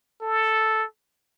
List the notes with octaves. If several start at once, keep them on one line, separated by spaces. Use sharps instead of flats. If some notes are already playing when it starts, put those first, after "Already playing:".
A4